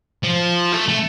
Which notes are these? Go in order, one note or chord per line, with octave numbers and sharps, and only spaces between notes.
F3
A3
A3